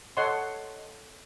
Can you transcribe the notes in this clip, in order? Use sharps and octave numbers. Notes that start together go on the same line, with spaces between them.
A4 C#5 D#5 F#5 C6